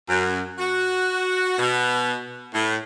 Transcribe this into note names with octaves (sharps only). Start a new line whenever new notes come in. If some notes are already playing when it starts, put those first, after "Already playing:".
F#2
F#4
B2
A2